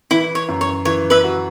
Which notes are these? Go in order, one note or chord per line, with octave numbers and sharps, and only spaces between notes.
E3 E4
C#5
F#2
C#5
E3 C#5
B4 E5
F#4